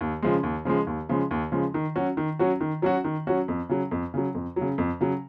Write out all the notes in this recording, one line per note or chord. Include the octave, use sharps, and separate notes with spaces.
D#2
C#3 F3 G#3
D#2
C#3 F3 G#3
D#2
C#3 F3 G#3
D#2
C#3 F3 G#3
D#3
F#3 C#4 F#4
D#3
F#3 C#4 F#4
D#3
F#3 C#4 F#4
D#3
F#3 C#4 F#4
F2
C#3 F#3
F2
C#3 F#3
F2
C#3 F#3
F2
C#3 F#3